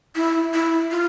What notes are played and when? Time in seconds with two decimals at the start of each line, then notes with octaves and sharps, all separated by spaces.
0.16 E4
0.54 E4
0.91 F4